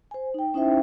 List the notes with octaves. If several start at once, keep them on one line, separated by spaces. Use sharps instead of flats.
C5 G#5
D#4 G5
C#4 D#4 E4 C5 E5 G5